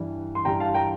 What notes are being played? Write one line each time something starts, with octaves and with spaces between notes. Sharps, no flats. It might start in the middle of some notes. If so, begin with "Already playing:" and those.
Already playing: G2 E3 G3
C6
G2 E3 G3 G5 A#5
F5 A5
G5 A#5